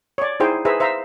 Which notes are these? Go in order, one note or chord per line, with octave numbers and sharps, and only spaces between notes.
C#5 D5
D#4 E4 G#4 C5 G5
G#4 B4 C5 E5 A#5
C5 E5 F5 A#5